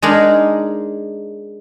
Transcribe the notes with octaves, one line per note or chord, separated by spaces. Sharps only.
G#3 D4 D#4 G#4 A#4